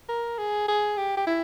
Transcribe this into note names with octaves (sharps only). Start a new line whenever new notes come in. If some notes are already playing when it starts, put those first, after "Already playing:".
A#4
G#4
G#4
G4
G4
E4